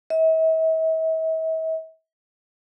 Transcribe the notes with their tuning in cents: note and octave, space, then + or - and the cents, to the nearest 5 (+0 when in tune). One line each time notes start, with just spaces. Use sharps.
E5 -45